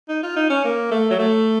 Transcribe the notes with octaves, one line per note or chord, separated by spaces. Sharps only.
D#4
F4
D#4
C#4
A#3
A3
F#3
A3